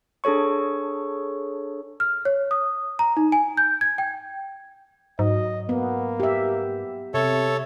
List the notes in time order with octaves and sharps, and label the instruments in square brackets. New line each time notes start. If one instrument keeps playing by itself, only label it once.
[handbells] D4 G#4 A4 C#5 C#6
[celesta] F6
C#5
D#6
A#5
D#4
G#5
G6
G#6
G5
[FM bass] G#2 [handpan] F#3 [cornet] D#5
[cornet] A#3 [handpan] B3
[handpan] G4 E5
[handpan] C3 [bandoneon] A4 C#5 [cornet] E5